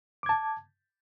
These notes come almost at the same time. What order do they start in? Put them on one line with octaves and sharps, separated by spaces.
D6 G#6 A5